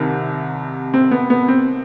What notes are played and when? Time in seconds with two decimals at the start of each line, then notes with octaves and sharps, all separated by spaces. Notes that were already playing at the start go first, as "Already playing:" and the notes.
Already playing: C2 C3 D#3
0.94 C4
1.11 B3
1.30 B3
1.48 C4